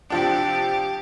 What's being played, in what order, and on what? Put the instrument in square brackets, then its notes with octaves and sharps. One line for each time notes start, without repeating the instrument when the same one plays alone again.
[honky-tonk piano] C3 F3 D4 [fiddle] G4